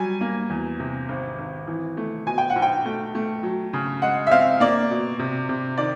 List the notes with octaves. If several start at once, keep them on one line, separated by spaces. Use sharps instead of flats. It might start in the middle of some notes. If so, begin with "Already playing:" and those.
Already playing: F#3 G3 G#5
A#3
E2
C3
G#1
G#1
E3
A3
B2 G#5
G5
F#5
B1
G5
A3
A3
F#3
C#3
G#3 F#5
E5
C4 F5
A#3 D5
B2
C3
C3
D#3 D5